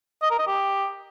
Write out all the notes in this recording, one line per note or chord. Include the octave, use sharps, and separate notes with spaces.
D#5
A#4
D#5
G4